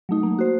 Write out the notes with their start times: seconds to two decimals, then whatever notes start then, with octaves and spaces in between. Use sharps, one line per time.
0.09 F#3 A3 D#4
0.23 A#3
0.39 F#4 C5